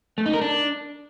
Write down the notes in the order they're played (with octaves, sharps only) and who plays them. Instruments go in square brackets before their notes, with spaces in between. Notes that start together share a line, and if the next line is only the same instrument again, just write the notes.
[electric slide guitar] A3
D#4
A#4
D4